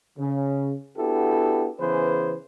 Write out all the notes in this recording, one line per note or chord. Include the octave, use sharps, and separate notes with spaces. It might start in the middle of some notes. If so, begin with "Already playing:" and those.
C#3
B3 D4 E4 F#4 G4 A4
C#3 E3 B3 G#4 B4 C5